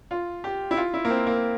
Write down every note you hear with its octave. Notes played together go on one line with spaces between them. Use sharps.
F4
G4
E4
F4
E4
A#3
C4
A#3